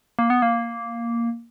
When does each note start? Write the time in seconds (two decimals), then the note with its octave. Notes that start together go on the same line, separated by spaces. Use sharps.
0.19 A#3
0.30 B3
0.42 A#3